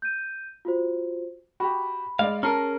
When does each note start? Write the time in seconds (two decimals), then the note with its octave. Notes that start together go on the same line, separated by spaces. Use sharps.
0.02 G6 D#7
0.65 F4 F#4 C5
1.60 F#4 G4 B5
2.19 G#3 D5 D#5 F5
2.43 C#4 G#4 A#4 A5 A#5 F6